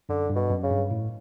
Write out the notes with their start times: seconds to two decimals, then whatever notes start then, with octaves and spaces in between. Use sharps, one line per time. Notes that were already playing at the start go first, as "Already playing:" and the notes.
0.09 F#2 D3
0.30 G2
0.36 B2
0.50 F#2
0.63 C#3
0.70 G2
0.91 A2